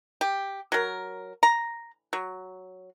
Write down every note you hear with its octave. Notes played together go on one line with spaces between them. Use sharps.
G4
F#3 A#4
A#5
F#3